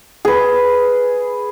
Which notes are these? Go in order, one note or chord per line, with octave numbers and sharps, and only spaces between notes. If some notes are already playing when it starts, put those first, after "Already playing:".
G#4 B4